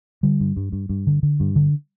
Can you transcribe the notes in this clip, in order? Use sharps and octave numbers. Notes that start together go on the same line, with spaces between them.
D3 G3
G2
G2
G2
G2
D3
D3
G2
D3